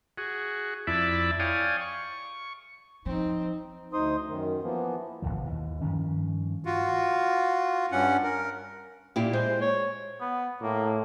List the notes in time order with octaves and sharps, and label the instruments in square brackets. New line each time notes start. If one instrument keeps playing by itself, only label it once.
[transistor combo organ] F#4 G#4
F2 E4 D5 E5 A5 B5
C#5 D5 F5 G5 G#5 D#6
C#6
[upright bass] F3 [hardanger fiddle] C4 [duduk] D#4
[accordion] D2 D#4 C5 C6 D#6
F#2 D#3
E3 F3 A#3 B3
[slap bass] G1 C#2 B2 F3
D#2 E3
G2 D#3 F3 C#4
[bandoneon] F4 F#4
G2 C#4 F#5
A#4
[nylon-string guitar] A#2 E4 G4
[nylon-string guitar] G#3 [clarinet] C5
[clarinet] C#5
[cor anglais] B3
[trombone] A2 [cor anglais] A#3